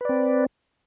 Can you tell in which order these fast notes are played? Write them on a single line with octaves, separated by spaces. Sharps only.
B4 D5 C4